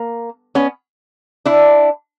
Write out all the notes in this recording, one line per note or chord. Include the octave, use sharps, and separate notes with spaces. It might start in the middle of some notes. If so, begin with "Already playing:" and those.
Already playing: A#3
B3 C#4
D4 E4